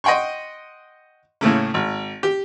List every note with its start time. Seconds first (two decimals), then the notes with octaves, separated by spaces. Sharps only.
0.04 D#5 F#5 G5 C6 C#6
1.41 A2 C#3 A3 A#3
1.74 G#1
2.23 G4